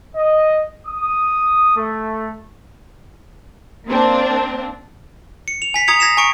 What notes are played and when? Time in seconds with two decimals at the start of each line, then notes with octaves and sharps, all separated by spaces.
0.16 D#5
0.87 D#6
1.76 A3
3.88 A#3 C4 D4
5.48 C#7
5.62 F7
5.74 G#5 B6 C7
5.87 A#5 D#6 G#6 C#7 F7
6.00 G#6 A#6 C7 E7
6.17 G#5 A#5 C#6 C#7 D7